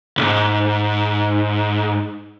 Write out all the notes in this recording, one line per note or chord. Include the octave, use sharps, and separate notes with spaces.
B1 G#2